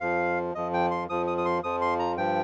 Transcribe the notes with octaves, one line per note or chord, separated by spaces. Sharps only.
F2 F3 F5
F2 F3 D#5
G5
C6
F2 F3 D#6
D#6
D#6
C6
F2 F3 D#6
C6
A#5
G2 F3 G5